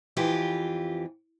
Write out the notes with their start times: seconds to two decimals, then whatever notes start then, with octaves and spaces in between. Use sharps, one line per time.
0.17 F2 E3 F4 G4